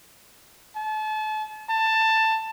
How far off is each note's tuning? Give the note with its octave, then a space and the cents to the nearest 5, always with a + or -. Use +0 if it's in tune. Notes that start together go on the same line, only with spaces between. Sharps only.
A5 -35
A5 +15